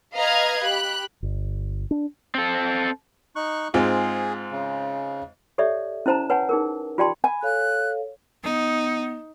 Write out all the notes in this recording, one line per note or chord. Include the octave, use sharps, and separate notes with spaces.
B4 D#5 F5 A#5 F6 G#6
G4 B5 F#6
G1
D4
C4 A4
D#4 C#6 F#6
G#2 C4 F4 G#4
C#3
G4 A4 C#5 D5 E5
C#4 E4 C5 A5 A#5
B4 C#5 F#5 G#5 A5
D#4 G#4 A#4
F4 G4 D5 G5 A5 C6
G#5 B5
A4 C#5 F5 F#6
B3 D#4